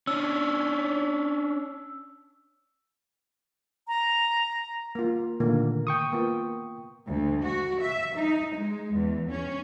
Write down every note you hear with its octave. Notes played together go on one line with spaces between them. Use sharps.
C#4 D4 E6
A#5
A#3 F4
A#2 D3 D#3 A3 A#3
G5 C#6 D#6
A#3 B3 F4
D2
F#4
E5
D#4
G#3
E2
C#4